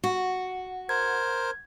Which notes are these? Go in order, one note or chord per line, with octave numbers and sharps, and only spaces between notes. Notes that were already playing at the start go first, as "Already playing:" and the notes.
F#4
A#4 C5 G#6